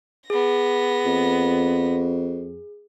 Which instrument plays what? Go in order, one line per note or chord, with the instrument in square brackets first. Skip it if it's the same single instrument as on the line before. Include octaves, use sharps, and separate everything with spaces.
[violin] B3 A#6 [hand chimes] G#4
[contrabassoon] F2